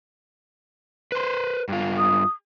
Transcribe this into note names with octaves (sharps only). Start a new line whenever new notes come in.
B4 C5
G2 F4
D#6